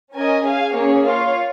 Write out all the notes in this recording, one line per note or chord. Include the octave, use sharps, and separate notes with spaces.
C#4 A#4 D#5 G#5
G#4 F5 G#5
A#3 C#4 G#4 C#5
F4 C#5 F5